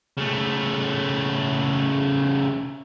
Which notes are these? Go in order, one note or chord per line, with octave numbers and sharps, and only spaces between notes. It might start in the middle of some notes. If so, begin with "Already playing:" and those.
C#3 A3